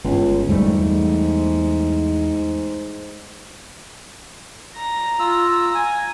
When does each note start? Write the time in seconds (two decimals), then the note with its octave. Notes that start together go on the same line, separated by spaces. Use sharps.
0.04 G1 C#2
0.49 E2 G#2 G3 A3
4.77 A#5
5.19 F4 E6
5.74 G#5